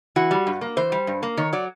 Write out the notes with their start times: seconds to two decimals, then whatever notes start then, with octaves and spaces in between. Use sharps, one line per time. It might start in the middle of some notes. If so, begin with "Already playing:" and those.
0.16 E3 F#4
0.31 G3
0.47 G2
0.61 A#3
0.77 E3 C5
0.92 G3
1.07 G2
1.23 A#3
1.37 D#3 C#5
1.53 F#3 D5